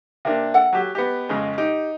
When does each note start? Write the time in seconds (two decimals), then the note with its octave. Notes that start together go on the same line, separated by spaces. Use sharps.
0.25 C3 A#3 D4
0.54 A4 F#5
0.73 F#3 G4
0.95 B3 G4 D#5
1.29 F2 C#3 G#3
1.58 D#4 G4